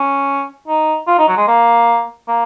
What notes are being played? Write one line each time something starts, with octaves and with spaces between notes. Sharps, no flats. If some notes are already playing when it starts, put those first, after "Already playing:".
Already playing: C#4
D#4
F4
D#4
F#3
G#3
A#3
A#3